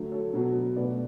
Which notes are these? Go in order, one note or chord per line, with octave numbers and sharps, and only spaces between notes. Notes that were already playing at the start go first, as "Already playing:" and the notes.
Already playing: D3 F#3 A3
A4 C#5
B2 F#3 B3
B2 A3 B4 D5